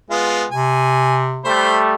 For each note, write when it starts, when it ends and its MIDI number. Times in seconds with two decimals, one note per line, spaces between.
0.10 0.45 56
0.10 0.45 59
0.10 0.45 65
0.51 1.47 48
0.51 1.23 80
1.45 1.95 55
1.45 1.95 57
1.45 1.79 72
1.45 1.79 83